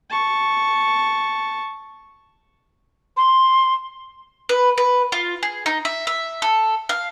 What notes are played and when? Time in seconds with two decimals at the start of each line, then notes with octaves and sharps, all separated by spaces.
0.10 A5 C#6
3.17 C6
4.49 B4
4.78 B4
5.12 F4
5.43 G#4
5.66 D#4
5.85 E5
6.07 E5
6.42 A4
6.89 F5